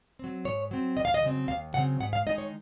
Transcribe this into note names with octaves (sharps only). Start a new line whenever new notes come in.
F#3 C4
G#2 C#5
F#3 C4
D#2 D#5
F5
D#5
C#3 F#3 C4
D#2 F5
C#3 F#3 C4 F#5
G#2 F#5
F5
D#3 G#3 D#4 D#5
C#5